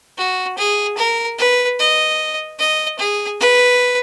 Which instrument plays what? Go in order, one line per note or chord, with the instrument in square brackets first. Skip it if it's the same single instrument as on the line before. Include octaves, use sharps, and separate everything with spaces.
[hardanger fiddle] F#4
G#4
A#4
B4
D#5
D#5
G#4
B4